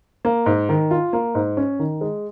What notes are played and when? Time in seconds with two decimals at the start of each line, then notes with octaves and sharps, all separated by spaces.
0.25 A#3
0.46 G#2
0.69 D#3
0.91 F4
1.13 A#3
1.35 G#2
1.57 C#4
1.79 D#3
2.01 G#3